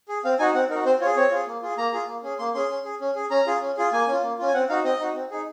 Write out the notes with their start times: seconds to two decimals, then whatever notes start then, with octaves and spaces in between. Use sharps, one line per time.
0.08 G#4
0.25 C4 F5
0.39 D#4 F#4 G#5
0.54 C4 F#5
0.70 D#4 A#4
0.74 F#4
0.85 C4 C5
1.00 F4 C#5
1.06 G#4
1.16 C4 C#5
1.31 F4 G#4
1.47 A#3
1.62 F4 G#4
1.77 A#3 A#5
1.93 F4 G#4
2.08 A#3
2.23 C#4 G#4
2.39 A#3 C6
2.54 C#4 G#4 C6
2.69 C#4
2.85 G#4
3.01 C#4
3.15 G#4
3.30 C#4 A#5
3.47 F4 G#4
3.61 C#4
3.77 F4 G#4
3.93 A#3 G#5
4.08 C#4 F4
4.22 A#3
4.39 C#4 F4
4.48 G#5
4.54 C4 F#5
4.69 D#4 F#4 F5
4.84 C4 D#5
4.99 D#4 F#4
5.15 C4
5.31 D#4 G#4